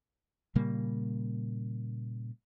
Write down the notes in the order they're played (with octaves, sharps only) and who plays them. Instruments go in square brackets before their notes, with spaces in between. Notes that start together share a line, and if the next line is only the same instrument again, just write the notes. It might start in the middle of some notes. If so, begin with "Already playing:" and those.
[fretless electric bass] A#2 C#3 G3 A#3